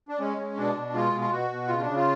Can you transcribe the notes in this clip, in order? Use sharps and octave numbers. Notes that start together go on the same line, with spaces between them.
D4
G#3 C#4
G#3
B2 D4
B2
G#3 F4
B2
F4
B2 F#4
B2
C#3 F4
C#3 D4
F4